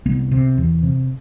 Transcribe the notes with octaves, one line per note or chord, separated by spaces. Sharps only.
C2 B3
C3
E2
C3